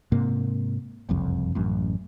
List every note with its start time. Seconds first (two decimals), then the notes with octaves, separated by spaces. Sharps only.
0.12 G#2 C3 A#3
1.09 F#1 C2 F2
1.55 A1 F#2